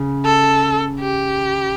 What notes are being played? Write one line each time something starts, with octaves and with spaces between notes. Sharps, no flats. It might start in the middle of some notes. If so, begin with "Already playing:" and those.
Already playing: C#3
A4
G4